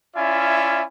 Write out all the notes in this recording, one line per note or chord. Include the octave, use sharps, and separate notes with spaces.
C#4 E4 F4 D5 E5 G#5